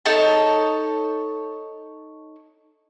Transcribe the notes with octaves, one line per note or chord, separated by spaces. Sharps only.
D#4 A4 C#5 A5